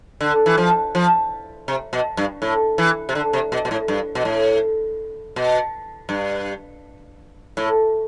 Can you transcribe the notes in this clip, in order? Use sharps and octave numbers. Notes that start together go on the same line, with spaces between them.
D3
E3
F3
F3
C3
B2
G2
A2
E3
C3
D3
C3
B2
B2
A2
G2
B2
A2
B2
G2
A2